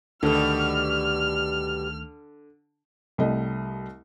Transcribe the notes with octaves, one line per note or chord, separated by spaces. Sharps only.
D2 B2 D3 D#3 G3 A3 F6
C2 G3 A3 D#5